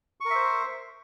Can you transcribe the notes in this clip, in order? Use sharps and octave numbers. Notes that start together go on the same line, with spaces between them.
A#4 C5 E5 C#6